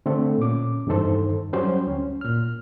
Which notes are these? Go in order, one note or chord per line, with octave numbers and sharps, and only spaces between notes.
D3 A3 C4 A4
A#2 C#4 D6
E2 G2 D#3 D#4 A4 C5
F#3 G3 C#4 C5 G5
D2 C#4
A#2 F6